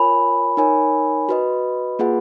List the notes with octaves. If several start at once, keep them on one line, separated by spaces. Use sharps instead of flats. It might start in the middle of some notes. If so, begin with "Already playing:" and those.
Already playing: F4 A#4 C#5 G#5 B5
D#4 A#4 C#5 G#5
F#4 B4 D#5
A#3 F4 G#4 B4 F#5